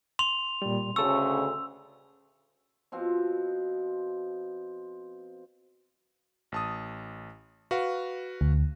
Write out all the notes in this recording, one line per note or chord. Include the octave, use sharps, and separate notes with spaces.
C6 F7
A#2 G3
D2 C#3 A4 C#6 E6
B2 F3 C4
A1 A5 D#6
F#4 B4 F5
D2